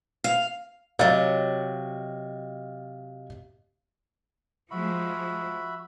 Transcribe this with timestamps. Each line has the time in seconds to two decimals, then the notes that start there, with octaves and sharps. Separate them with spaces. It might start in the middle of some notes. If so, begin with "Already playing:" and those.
0.24 F5
0.99 C3 F#3 D#5 F5 A6
4.71 F3 G#3 F#4 E5 B5